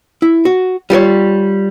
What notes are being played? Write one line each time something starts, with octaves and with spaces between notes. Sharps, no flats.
E4
F#4
G3 F4 A#4 C#5